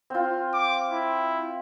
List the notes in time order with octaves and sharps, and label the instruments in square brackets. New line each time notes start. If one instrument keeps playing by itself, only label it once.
[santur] C4 F4
[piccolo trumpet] D6
E4